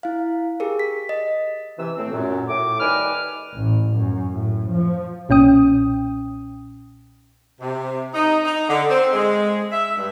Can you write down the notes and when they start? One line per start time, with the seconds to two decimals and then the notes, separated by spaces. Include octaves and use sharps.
0.03 E4 F5
0.60 G4 G#4 A#4
0.79 B6
1.09 D#5
1.78 C3 E3 E6
1.97 A2 A3 C4
2.12 F#2 A#2
2.48 A2 D6
2.80 D#3 G3 B4 G#5 D6 F6
3.54 A1
3.96 F#2
4.33 A2
4.71 F3
5.29 B1 A#2 C#4 G5 D#6
7.60 C3
8.14 D#4
8.45 D#4
8.69 D3
8.90 C4
9.13 G#3
9.72 E5
9.97 G2